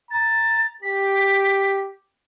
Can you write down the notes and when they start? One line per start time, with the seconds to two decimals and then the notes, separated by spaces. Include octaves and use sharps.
0.11 A#5 A6
0.83 G4 B6